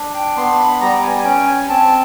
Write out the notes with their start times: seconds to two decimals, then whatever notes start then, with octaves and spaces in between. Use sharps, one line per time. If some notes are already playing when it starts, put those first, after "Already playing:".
Already playing: D4
0.15 G5
0.36 B3 C6
0.59 B5
0.81 G3 A#5
0.94 G5
1.03 G#5
1.19 G#5
1.25 C#4 G5
1.47 G#5
1.69 C4 A5